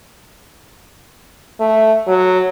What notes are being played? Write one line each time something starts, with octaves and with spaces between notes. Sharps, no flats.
A3
F#3